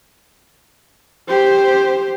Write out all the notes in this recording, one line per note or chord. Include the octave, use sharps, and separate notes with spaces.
G4 C5